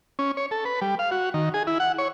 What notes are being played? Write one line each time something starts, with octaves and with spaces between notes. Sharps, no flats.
C#4
C#5
A4
B4
G3
F5
F#4
D#3
G#4
E4
F#5
C#5